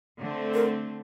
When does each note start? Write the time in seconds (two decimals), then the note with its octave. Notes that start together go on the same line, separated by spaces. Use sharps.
0.18 D3 A3 C4
0.54 A#4